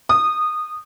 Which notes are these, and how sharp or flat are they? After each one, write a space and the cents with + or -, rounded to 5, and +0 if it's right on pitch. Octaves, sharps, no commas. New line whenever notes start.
D#6 -15